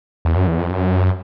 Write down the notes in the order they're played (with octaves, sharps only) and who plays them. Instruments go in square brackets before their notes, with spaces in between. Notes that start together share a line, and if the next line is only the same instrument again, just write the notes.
[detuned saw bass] E2
F#2
E2
F2
F#2